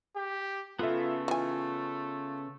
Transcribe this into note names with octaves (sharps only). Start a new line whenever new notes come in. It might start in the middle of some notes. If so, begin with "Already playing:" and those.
G4
C#3 A3 B3 F4 A4 E5
E3 F4 G#5